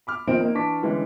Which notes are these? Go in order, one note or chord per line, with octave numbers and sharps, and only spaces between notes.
B5 D6 F6
F2 A#2 D#3 C4 D#5 D7
A#3 D#4
E3 D4 A5 C#6 D6 B6
D3 E3 G3 G#3 C#4 D#4